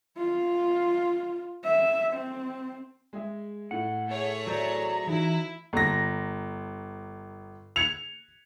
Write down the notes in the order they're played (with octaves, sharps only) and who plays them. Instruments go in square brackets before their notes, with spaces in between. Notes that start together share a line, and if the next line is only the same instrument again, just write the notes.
[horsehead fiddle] F4
E5
C4
[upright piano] G#3 G#4 E5
[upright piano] A2 [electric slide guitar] F#5
[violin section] A3 G#4 C#5
[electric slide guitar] F#3 C5 D5 [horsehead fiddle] A#5
[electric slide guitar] E3 [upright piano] D#4 F#4 [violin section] E4
[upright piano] G1 A#6
G#6 C#7 F7